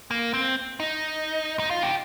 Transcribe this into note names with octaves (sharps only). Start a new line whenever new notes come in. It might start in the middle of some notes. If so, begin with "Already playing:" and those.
A#3
C4
D#4
D#4
F4
G4